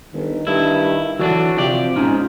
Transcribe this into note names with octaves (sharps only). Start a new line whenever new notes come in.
G1 D#3
G2 E4
D3 E3 F#3 D4 F#4
C3 F3 G4 D5
G#2 C#4 D#4 F4